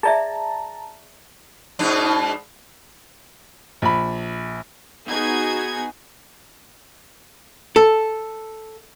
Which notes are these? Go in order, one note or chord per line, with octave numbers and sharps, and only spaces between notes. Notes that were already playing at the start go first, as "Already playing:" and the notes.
G#4 D5 E5 A5 A#5
G#2 B2 D4
A#1 B5
B3 D#4 F#4 G#4 G#6
A4